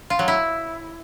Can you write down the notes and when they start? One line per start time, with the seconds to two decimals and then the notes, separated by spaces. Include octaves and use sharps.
0.10 F4
0.19 F#3
0.28 E4